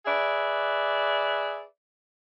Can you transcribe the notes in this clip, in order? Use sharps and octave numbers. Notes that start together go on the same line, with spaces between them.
G#4 B4 D5 E5